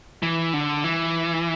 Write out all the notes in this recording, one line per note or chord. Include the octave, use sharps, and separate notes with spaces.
E3
D3
E3